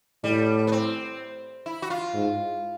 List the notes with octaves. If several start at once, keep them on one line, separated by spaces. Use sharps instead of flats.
A2 G3
B3
C4
E4
F#4
F4
G#2